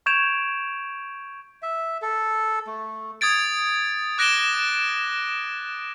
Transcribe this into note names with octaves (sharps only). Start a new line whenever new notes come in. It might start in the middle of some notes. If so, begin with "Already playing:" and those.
C#6 G6 G#6 D7 E7 F7
E5
A4
A3
D#6 G#6 A6 D7
D6 F#6 A#6 D7 E7 G7